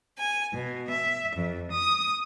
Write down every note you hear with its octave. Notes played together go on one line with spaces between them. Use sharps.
G#5
B2
E5
F2
D#6